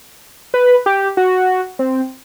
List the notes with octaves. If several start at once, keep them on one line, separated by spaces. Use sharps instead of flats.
B4
G4
F#4
C4